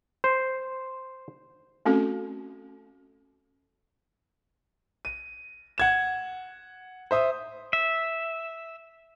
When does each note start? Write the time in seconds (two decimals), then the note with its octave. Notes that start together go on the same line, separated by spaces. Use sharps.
0.24 C5
1.85 A3 C4 C#4 F#4 A4
5.05 D#7
5.78 F#5 G#6 E7
7.11 C5 E5 D#6
7.73 E5